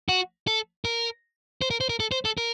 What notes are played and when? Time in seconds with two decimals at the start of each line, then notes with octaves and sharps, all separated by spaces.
0.09 F#4
0.47 A4
0.85 A#4
1.62 C5
1.70 A#4
1.80 C5
1.89 A#4
2.00 A4
2.12 C5
2.25 A4
2.38 A#4